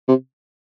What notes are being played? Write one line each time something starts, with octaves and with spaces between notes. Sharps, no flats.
C3